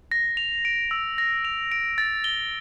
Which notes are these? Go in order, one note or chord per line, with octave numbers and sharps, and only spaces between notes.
A#6
F7
D7
E6
A#6
F7
D7
A6
G7